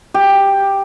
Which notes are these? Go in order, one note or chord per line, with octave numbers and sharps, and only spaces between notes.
G4